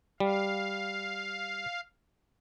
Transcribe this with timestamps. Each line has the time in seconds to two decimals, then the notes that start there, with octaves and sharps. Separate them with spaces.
0.20 G3 F5